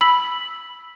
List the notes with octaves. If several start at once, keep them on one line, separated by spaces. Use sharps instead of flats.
B5 E6 B6 F#7